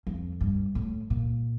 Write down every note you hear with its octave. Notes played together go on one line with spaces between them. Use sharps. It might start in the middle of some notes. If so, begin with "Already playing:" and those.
F2
G2
A2
A#2